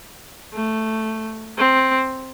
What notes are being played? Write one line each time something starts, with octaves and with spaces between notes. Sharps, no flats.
A3
C4